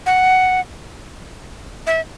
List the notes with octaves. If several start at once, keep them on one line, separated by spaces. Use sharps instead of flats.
F#5
E5